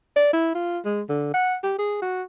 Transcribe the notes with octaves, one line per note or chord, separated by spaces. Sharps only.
D5
E4
F4
G#3
D3
F#5
G4
G#4
F#4